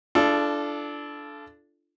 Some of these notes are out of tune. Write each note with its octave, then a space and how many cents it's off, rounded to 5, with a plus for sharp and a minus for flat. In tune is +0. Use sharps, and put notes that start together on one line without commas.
D4 +0 F4 -40 A4 -20